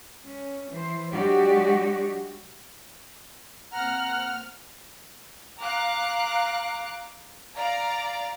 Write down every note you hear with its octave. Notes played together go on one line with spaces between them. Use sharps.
C#4
E3 C5
F#3 G#3 D4 F#4 G4 D5
A#3 C4 F#5 A#5 F6
F5 A#5 D6 F#6
D5 F5 A#5